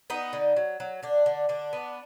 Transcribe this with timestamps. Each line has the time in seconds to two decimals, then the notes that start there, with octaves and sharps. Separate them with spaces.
0.10 B3 D#4
0.33 D3
0.57 F#3
0.80 F#3
1.03 D3 D4
1.26 D3
1.49 D3 D4
1.73 B3